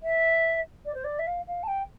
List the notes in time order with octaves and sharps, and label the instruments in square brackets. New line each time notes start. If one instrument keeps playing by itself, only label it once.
[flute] E5
D5
C5
D5
E5
F5
F5
A5
G5